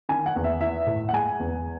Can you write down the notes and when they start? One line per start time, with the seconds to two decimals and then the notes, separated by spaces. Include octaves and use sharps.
0.09 D#3 G#5
0.26 F#5
0.36 E2
0.44 E5
0.61 E4 E5
0.87 A2
1.09 F#5
1.13 G#3 G#5
1.40 E2